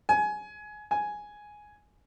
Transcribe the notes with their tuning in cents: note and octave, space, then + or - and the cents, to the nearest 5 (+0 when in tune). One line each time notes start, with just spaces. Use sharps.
G#5 +20
G#5 +5